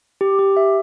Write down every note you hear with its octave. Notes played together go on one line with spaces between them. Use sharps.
G4
G4
E5